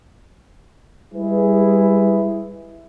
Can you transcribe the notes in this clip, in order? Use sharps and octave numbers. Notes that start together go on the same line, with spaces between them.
G3 G#3 E4 G#4 B4